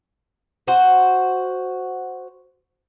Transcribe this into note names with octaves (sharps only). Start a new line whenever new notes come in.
F#4 C5